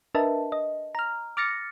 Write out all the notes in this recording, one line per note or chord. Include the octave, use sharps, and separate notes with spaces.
D4 A#4 B4 D#5 E5 A5
D#5
A#5 F6
D6 F6 A6 A#6 C#7